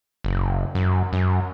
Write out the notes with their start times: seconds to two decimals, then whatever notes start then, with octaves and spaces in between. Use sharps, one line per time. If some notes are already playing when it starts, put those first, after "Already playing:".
0.24 F#1
0.75 F#2
1.13 F#2